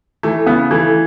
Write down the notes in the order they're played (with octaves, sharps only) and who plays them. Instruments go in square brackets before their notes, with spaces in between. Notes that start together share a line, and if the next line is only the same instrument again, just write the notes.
[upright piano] E3 A3
C#3 B3
E3 A3